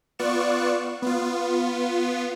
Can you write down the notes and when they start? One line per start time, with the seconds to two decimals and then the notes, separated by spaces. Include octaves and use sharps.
0.19 B3 F4 D5 C#6 F#6 E7
1.02 B3 F4